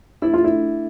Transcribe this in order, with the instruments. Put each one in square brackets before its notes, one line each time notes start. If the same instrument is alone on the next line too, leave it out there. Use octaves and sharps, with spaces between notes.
[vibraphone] A3 D4 A4 E5 [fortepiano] E4
[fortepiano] F4
E4